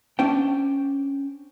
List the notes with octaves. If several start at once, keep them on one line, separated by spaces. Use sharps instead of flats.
C#4 D4 C5 G5